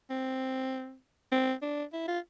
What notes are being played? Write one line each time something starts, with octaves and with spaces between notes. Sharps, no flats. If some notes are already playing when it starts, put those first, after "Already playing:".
C4
C4
D4
E4
F4